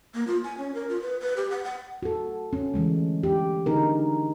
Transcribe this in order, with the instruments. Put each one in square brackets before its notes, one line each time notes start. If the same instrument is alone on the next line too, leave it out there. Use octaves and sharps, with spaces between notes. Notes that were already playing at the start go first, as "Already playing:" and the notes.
[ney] A#3
F4
G#5
C#4
A#4
F4
B4
B4
G4
F#5
F#5
[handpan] F#4 A4
C#4
D3 E3 G#3 A3
G4
D3 D#4 G#4 A#4